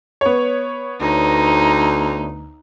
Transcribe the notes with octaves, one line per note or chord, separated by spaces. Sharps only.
B3 C#5
D2 D#4